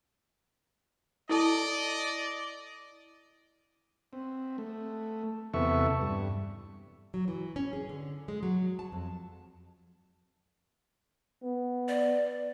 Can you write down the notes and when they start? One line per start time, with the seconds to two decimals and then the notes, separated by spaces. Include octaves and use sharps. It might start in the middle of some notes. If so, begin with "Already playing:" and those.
1.29 E4 A4 D5 D#5 A5
4.13 C4
4.58 A3
5.54 E2 C3 B3 A4 E5 C#6
6.01 G2
7.14 F#3
7.28 E3
7.56 C#4
7.73 G#4
7.89 D3
8.28 G#3
8.43 F#3
8.79 A5
8.92 F2
11.43 B3
11.89 D5